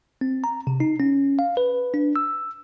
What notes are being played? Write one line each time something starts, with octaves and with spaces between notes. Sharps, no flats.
C4
A#5
C3
D#4
C#4
F5
B4
D4
E6